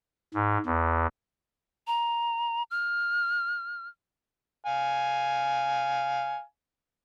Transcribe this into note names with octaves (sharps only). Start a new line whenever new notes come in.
G#2
E2
A#5
F6
F5 G#5